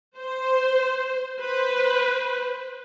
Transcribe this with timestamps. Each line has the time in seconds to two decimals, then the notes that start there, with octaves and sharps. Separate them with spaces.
0.18 C5
1.41 B4 C5